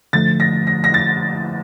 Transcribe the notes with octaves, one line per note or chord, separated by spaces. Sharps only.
D3 F3 A3 A6
A#6
A#6
A#6
A6